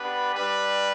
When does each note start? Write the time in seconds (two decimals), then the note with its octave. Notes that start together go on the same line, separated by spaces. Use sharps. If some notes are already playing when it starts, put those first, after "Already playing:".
Already playing: B3 D4 G4 B4
0.33 G3 D4 G4 B4